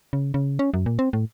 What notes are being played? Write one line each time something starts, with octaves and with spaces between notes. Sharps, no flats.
C#3
C#3
C#4
F#2
A#2
C4
A2